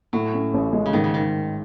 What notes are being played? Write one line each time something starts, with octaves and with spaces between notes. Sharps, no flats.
A2 F#3
C#4
A1
G#3
C#3
G#2 D#3
C#3
D#3